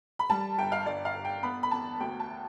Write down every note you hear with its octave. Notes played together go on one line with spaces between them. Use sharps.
B5
G3 A5
G1 G5
F5
G1 D5
F5
G1
G5
B3 B5
B5
E2 A5
D2 G5
A5